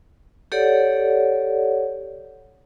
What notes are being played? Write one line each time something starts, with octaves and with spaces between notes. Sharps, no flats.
G4 A4 C#5 D5 F#5